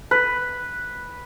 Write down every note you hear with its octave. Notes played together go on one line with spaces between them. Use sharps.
B4